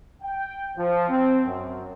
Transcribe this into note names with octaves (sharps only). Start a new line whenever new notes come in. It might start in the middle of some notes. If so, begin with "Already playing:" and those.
G5
F3
C4
F#2